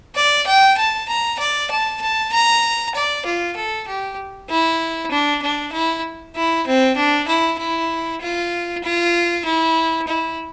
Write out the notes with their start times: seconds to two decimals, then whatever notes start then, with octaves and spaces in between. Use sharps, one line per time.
0.15 D5
0.46 G5
0.77 A5
1.08 A#5
1.40 D5
1.71 A5
2.01 A5
2.32 A#5
2.95 D5
3.26 F4
3.56 A4
3.88 G4
4.49 E4
5.11 D4
5.42 D4
5.73 E4
6.35 E4
6.67 C4
6.97 D4
7.28 E4
7.59 E4
8.21 F4
8.84 F4
9.45 E4
10.07 E4